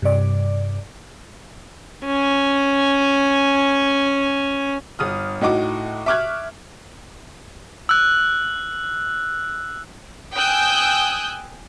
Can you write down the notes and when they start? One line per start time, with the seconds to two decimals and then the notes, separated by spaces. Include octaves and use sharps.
0.02 G2 C3 D5
2.05 C#4 G#5
4.99 G1 D#6 F6
5.41 A2 D#4 F#4 D6
6.06 E5 C#6 D6 F6 F#6 G#6
7.89 E6 F#6
10.35 G5 G#5 D#6 E6 F#6 G6